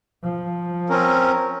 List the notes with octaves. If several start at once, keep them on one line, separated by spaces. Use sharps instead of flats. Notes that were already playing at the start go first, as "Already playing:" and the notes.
F3
C4 C#4 A#4